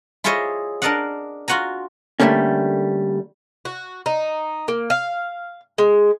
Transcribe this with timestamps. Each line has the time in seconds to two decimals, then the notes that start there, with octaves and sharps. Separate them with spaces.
0.24 E4 F4 G#4 C5 C#5 D#5
0.82 D4 A#4 D5 D#5 F5 F#5
1.48 F4 F#4 F#5 G#5 A#5
2.20 D3 F3 G3 A3 A#3 C#4
3.65 F#4
4.06 D#4
4.68 A#3
4.90 F5
5.78 G#3